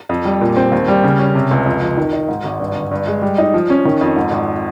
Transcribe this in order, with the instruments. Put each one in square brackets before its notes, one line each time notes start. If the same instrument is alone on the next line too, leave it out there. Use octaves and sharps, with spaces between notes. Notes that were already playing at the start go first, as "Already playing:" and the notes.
[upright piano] F2
G3
A#2
C4
D#2
G3
C#3
C#4
C3
C#2
F2
F3
D#3
D#4
G#2
G#1
G2
G1
G2
G#3
G3
D#4
F3
C#4
D#3
F2
G#2
G#1